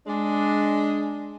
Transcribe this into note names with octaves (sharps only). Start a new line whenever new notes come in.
G#3 D4